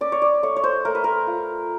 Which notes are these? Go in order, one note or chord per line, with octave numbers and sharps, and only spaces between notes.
C#4 D5
C#5
D5
A3 C#5
C#5
C5
A3 A#4
B4
A#4
F4